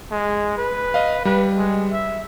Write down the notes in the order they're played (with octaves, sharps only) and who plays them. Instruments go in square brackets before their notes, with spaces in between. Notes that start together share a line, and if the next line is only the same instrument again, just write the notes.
[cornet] G#3
B4
[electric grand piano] D#5 F5
[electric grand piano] G3 [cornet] B4
[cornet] G#3
E5